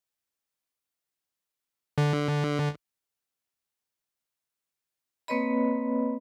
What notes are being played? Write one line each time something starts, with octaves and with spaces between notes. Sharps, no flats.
D3
A#3 C4 B4 C#5 D#5 B5